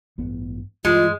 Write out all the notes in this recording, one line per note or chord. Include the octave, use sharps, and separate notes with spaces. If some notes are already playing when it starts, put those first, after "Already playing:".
A1 G2 B3
G2 E3 G3 G#3 F4